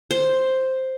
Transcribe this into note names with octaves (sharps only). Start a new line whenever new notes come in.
C5